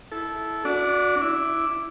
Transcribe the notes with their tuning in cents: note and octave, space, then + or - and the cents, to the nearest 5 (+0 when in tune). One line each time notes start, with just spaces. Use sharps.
E4 +0 A4 -20
D4 -45 F#4 -20 D5 +0
E4 +0 D6 +0